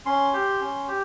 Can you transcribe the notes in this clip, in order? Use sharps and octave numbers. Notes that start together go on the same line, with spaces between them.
C#4 C6
G4
C#4
G4